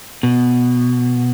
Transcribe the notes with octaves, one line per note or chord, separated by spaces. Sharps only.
B2